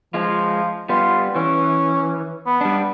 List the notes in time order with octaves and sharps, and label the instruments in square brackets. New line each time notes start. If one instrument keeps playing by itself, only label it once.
[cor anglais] F3 [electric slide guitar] G#3 F4
[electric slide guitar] G3 B3 [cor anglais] F4
[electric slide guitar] E3 [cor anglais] C#4
[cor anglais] B3
[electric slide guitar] G3 D4